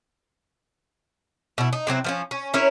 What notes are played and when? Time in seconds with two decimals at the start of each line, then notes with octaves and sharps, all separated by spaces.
1.58 B2 E4
1.73 D#4
1.87 C3 F#3 C4 E4
2.04 F3 B3 C#4
2.31 C#4
2.54 C#4 E4 A#4 C#5